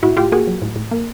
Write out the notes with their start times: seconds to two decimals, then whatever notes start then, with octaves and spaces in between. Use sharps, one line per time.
0.03 A2 E4 F#4
0.17 A2 F4 G4
0.32 A#3 F#4 G#4
0.47 F#3
0.62 A2
0.76 A2
0.91 A#3